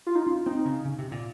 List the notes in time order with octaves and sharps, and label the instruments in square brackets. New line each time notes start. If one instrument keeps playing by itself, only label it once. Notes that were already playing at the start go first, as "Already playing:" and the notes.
[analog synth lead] F4
D#4
F4
[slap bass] C#4
[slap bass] C4 [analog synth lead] D#4
[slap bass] C#3
C#3
C3
A#2